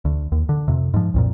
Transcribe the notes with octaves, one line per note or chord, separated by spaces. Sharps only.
D2
D#2
D3
F2 C3
G#2 F3
C2 F2 A#2